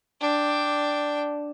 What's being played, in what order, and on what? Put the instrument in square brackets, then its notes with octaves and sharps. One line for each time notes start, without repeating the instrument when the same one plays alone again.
[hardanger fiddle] D4 G5